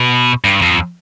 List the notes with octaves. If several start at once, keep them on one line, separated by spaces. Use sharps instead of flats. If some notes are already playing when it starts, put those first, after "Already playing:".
Already playing: B2
G2
F2